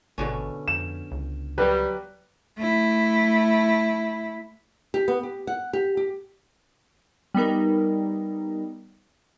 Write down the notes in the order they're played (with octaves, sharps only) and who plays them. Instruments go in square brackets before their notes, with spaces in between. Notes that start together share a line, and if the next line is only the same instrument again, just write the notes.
[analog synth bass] G#1 [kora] B2 D3 C#4
[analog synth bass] F2 [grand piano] E7
[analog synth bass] C#2
[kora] F#3 [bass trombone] G3 [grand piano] B4
[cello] A3 E4
[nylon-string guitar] G4
B3
G4
F#5
G4
G4
[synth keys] G3 B3 D#4 A#4